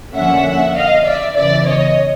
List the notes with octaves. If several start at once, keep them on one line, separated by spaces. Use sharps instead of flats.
F2 D3 F3 A#3 C#4 E5 F#5
D#5 F5
D5 E5
E2 C#3 E3 D5 E5
C#5 D#5